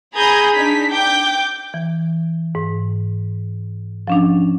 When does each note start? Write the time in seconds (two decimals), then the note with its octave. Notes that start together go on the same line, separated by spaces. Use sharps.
0.16 G#4 A#5 B5 D#6 G6 G#6
0.55 D4 D#4 B6
0.93 G5 D6 G6
1.74 E3
2.55 G#2
4.07 F3 C#4 D4